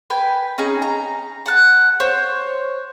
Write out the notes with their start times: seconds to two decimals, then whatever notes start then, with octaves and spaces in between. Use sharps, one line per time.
0.10 B4 G5 G#5
0.58 C#4 D#4 G#4
0.82 A#5
1.46 F#5 A5 F#6
2.00 C5 C#5